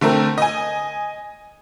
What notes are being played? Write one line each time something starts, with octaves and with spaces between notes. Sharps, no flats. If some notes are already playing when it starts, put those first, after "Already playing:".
D3 A3 C4 A#4
D#5 G#5